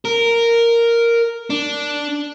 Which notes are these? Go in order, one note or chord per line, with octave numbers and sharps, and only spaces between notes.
A#4
D4